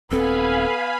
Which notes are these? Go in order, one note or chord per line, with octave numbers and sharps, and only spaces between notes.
D#1 B3 C4 A4 F5 G#5 B5